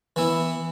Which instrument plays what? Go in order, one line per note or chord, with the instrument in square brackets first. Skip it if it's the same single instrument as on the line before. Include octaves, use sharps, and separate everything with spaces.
[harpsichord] E3 B3 E4